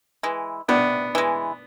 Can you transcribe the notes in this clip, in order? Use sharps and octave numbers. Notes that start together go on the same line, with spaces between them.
E3 G#3
C3 B3 D4
E3 G#3